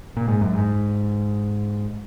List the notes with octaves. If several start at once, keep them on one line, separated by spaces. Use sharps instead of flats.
A#2
G#2
F#2
G#2